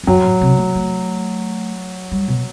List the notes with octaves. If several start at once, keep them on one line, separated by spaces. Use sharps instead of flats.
E2
F#2 F#3
A2
C3
A3
A3
G3
B2